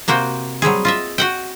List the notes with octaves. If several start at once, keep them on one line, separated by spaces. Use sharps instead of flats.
C3 A#3 F#4 C5 G5
F#3 G3 C4 G#4
F4 D#5 E5
F#4 F#5 G5